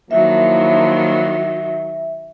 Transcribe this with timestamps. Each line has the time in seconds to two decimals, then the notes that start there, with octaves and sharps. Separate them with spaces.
0.11 D#3 F3 F#3 A#3 E4 E5